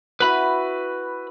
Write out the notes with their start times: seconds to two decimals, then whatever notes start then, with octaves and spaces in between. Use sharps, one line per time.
0.20 E4 F#4 B4 B5